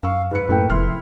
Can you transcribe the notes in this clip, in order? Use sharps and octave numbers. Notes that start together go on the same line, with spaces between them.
F#2 F5 C#6 E6
G#2 B4 C#7
F#2 A2 A3 A#3 E4 A4 G5
F1 C3 F3 E4 C6 F6